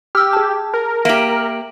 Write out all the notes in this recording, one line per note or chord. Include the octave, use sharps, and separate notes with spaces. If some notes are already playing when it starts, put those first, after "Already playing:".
G4 E6 F6
G#4 A5
A#4
A#3 G4 E5 D7 F#7